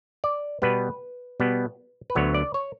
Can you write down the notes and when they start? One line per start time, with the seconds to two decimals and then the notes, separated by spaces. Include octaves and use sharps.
0.24 D5
0.62 B2 G3 B3 B4
1.40 B2 G3 B3
2.10 B4
2.15 D2 D3 F#3 B3 C#5
2.34 D5
2.54 C#5